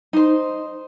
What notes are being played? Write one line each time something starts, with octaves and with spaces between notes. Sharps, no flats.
D#4 C5